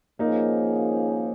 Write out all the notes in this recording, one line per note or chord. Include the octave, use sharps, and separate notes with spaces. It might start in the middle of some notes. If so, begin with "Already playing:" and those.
G#1 G#2 F3 A#3 C#4 D#4 G#4